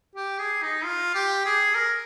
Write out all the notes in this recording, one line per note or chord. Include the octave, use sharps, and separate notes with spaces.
G4
G#4
D#4
F4
G4
G#4
A#4